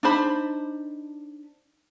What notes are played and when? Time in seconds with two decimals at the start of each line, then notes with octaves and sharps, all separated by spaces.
0.03 D4 D#4 C5 B5